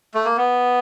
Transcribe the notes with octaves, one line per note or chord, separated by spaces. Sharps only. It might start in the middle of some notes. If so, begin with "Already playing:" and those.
A3
A#3
B3